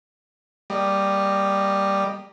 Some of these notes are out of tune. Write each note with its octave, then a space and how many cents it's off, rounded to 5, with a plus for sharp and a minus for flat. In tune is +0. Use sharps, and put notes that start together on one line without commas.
G3 +0 A#3 -10 D#5 -15